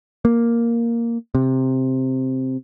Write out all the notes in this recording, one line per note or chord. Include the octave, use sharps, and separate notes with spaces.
A#3
C3